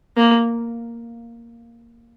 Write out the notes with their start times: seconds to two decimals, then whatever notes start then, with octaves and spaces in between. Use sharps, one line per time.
0.17 A#3